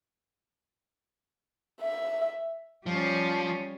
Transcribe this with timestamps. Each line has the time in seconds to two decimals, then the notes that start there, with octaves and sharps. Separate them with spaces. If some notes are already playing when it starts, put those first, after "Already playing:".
1.81 E5
2.86 F3 G3 C#4